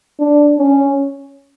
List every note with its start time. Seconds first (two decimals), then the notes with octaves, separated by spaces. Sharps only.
0.20 D4
0.58 C#4